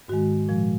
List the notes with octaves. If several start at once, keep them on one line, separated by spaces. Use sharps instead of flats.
G#2 D#3 G#3 F#4
A#2 F3 G#3